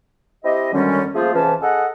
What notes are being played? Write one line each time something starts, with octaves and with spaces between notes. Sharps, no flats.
C4 E4 G4 D#5
F#2 D3 D#3 G3 G#3 C#4
F3 A3 A#3 F4 G#4 C5
C#2 C3 E3 C#4 B4 A5
G#4 A4 D#5 F#5